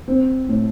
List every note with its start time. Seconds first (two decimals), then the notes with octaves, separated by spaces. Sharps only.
0.08 C4
0.48 A2